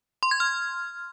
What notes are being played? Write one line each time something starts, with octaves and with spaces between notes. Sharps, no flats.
C6
G#6
F6